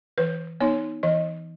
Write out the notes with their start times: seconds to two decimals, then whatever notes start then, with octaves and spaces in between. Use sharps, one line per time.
0.18 E3 B4
0.60 B3 D#4 C#5
1.03 E3 D#5